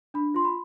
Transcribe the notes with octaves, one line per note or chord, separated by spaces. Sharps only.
D4 B5
F4 C6
B5